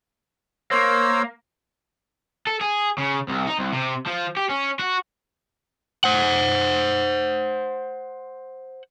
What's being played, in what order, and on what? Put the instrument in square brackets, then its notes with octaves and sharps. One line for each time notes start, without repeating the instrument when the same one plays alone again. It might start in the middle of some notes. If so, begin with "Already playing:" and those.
[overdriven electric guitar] A#3 [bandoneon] C5 C#5 E6
[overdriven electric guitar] A4
G#4
C#3
C2
D#4
C2
C3
F3
G4
C#4
F#4
[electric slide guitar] C5 F#5